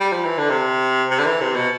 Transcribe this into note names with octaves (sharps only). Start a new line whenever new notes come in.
G3
F3
E3
D3
C3
C3
D3
E3
C3
B2